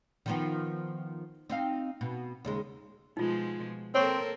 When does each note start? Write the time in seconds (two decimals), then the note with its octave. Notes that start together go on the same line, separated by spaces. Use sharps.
0.26 D#3 F3 B3
1.50 C4 D#4 F5
2.01 B2
2.45 D#2 C#3 G#3
3.17 B2 F3 G#3 D#4 F4
3.95 A#3 C4 A4 A#4 C#5 C6 C#6